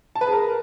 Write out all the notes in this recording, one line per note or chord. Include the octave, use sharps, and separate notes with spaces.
A5
B4
G#4
A#4